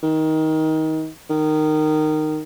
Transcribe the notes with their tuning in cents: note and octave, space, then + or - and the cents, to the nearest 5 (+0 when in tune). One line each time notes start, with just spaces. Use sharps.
D#3 +20
D#3 -15